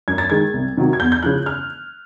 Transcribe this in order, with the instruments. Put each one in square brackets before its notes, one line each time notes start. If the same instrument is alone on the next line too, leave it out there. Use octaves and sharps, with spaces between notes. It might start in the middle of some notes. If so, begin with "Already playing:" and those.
[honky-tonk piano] F#2 G#6
A6
D#3 G#3 G#6
C2
C3 D#3 F#3
G#6
E2 G6
G6
C#3 F3 F#6
F6